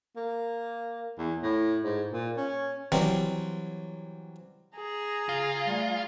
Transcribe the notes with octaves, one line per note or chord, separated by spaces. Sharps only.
A#3
E2
A2
G#2
A#2
C#4
E3 F#3 G3 C4
G#4 A#5
C#3 F4
G3 A3